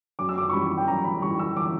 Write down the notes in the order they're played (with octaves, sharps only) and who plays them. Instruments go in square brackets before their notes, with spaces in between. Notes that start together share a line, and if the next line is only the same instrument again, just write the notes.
[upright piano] F#2 D6
E6
D6
C#6
E3 G3 C#4 B5
G5
F#2 A#5
B5
E3 G3 C#4 C#6
E6
D6